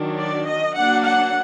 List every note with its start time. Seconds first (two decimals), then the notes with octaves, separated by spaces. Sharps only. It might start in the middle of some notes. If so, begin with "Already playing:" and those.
Already playing: D#3 F#3 D4
0.20 D5
0.48 D#5
0.76 F#3 A#3 D4 F#5
1.05 F#5